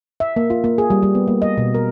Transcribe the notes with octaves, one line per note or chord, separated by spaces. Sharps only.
E5
A#3
F4
A#3
G#4
G3
G3
B3
A#3
D#5
B2
A#4